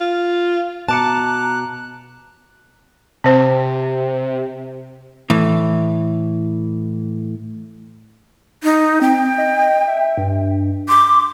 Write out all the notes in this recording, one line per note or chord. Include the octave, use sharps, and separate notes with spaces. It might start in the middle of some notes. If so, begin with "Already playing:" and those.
F4
B2 A5 A#5 D6 F#6 C#7
C3 C4 C5
A2 E3
D#4
C4 G5
D#5
E5
G2
C6 D6